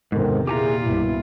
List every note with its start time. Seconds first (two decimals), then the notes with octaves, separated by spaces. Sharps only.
0.12 E2 G#2 C3 D#3 C4 A4 A#4
0.47 A#2 A#3 E4 F4 G4 G#4 G#5 A#5
0.83 C2 G2 B2 E4